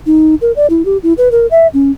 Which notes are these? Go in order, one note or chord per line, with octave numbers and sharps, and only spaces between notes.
D#4
A#4
D5
E4
G4
E4
B4
A#4
E5
C#4